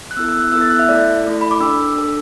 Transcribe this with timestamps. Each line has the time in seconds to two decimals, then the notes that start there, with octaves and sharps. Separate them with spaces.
0.11 F#6
0.17 B3 E4 A4 E6
0.29 E6
0.40 F#6
0.52 B3 E4 A4 E6
0.61 A6
0.70 F#6
0.79 E5
0.88 A3 E4 A4 D5
1.24 A3 E4 A4
1.41 B5
1.51 D6
1.60 D4 A4 E6
1.95 D4 A4